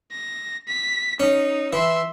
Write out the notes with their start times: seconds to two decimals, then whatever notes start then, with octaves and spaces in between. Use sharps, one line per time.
0.12 A#6
0.68 B6
1.20 C#4 D#4
1.73 E3 E5 C6